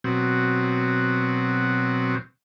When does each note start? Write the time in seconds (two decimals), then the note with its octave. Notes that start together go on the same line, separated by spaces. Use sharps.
0.04 B2 F#3 C4